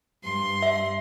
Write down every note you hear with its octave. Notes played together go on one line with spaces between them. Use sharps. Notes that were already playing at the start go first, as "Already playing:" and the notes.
G2 C6
E5